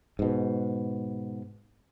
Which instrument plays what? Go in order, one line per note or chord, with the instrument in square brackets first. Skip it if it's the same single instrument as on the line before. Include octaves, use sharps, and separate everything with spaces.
[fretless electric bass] G#2 B2